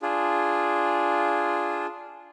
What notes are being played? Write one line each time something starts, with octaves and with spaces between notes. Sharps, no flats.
D4 F4 G#4